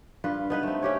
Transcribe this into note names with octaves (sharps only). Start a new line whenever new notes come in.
G2 F4 B4
B3 D#4 B4
A3 C4
C#4 G4 C#5